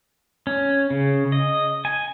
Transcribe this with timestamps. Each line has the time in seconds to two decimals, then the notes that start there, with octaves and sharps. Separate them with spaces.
0.47 C#4
0.90 C#3
1.32 D#5
1.85 G#5